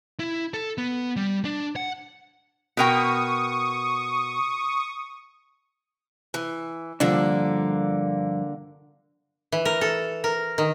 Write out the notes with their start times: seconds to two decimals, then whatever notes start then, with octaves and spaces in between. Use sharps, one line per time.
0.20 E4
0.54 A4
0.78 B3
1.16 G3
1.45 D4
1.76 F#5
2.77 B2 A#4 G5 C#6 D#6
6.34 E3
7.00 G2 D3 F3 A#3 D4
9.52 E3
9.65 A#4
9.81 A4
10.24 A#4
10.58 D#3